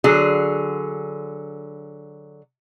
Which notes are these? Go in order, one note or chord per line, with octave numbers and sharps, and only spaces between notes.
D3 F#3 G#4